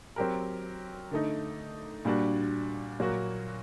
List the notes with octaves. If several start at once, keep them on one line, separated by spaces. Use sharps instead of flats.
F#3 C4 G4 A#4
D3 A3 D#4
A#2 G3 D4 F#4
A#2 F#3 A#3 F#4